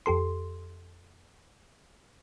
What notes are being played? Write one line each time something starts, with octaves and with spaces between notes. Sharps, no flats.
F2 G4 A4 C6